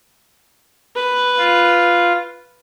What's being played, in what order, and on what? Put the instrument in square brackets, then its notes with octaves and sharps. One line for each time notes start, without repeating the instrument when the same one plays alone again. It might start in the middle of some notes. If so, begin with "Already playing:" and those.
[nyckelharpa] B4
[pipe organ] F4